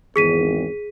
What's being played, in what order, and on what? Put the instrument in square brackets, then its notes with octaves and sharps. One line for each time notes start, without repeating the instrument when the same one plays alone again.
[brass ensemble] G#1 E2 [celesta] G#4 B6 D#7